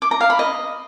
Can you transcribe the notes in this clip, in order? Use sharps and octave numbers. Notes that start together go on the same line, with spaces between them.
D6
A#5
F5
B5
D#5